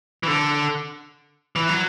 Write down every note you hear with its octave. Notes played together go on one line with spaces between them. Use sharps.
E3
D3
E3
F#3